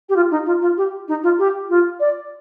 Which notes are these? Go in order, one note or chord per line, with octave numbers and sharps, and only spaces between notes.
G4
F4
D#4
F4
F4
G4
D#4
F4
G4
F4
D5